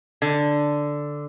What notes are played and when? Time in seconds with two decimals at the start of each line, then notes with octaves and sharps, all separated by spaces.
0.22 D3